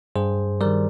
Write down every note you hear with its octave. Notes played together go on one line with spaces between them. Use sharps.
G2 G#4 C5
D#3 G3 A#4 D5